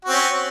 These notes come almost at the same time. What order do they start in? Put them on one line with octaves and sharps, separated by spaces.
F#4 C4 C#4